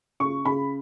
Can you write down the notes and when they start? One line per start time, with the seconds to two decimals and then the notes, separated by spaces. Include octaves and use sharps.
0.20 C#3 C#6
0.45 C#3 B5